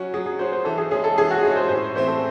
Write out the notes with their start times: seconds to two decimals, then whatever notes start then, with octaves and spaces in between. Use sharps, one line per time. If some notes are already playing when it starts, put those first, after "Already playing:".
Already playing: F#3 C#4 F#4
0.14 F#3 G#4
0.26 G#4
0.39 C#4 F#4 C5
0.52 C5
0.65 E3 A4
0.78 G#4
0.91 G#3 C#4 G#4
1.04 A4
1.17 E3 G#4
1.31 F#4
1.43 G#3 C#4 G#4
1.56 C5
1.69 A2 C5
1.95 E3 A3 C4 C5
2.08 A4